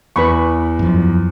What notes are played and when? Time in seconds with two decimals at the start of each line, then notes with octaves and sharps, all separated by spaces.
0.16 E2 B4 B5 C#6
0.79 F#2 F3